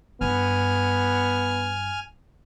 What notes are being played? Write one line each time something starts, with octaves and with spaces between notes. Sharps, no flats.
G2 B3 G#5 F6